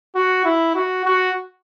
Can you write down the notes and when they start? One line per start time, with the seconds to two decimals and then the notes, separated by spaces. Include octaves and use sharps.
0.15 F#4
0.45 E4
0.75 F#4
1.05 F#4